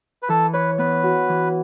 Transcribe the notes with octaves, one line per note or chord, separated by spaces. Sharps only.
B4
E3 A4
B4 C#5
B3 B4
F#4
E3